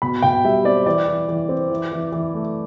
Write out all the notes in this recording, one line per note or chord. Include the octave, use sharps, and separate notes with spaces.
B2 B5
B2 G5
G3 E5
C4 D5
E3 D5
E3
E3
C4
E3
E3
E3
A3